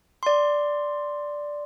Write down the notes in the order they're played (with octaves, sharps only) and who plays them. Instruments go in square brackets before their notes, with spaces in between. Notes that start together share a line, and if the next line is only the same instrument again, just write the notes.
[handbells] D5 C6